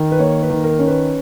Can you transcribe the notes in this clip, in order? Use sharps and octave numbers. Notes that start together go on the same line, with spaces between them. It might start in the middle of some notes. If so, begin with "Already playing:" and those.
Already playing: D#3
B4
A#3 C#5
B4
D#3
A#4
C#4
B4